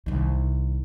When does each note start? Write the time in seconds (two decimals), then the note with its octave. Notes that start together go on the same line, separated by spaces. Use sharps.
0.06 C2 D#3